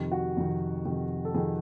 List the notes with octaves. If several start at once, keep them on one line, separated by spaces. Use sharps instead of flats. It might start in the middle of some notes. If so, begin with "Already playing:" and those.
Already playing: F2 C3 D#3
F#4
F2 C3 D#3
F2 C3 D#3
A4
F2 C3 D#3 G#4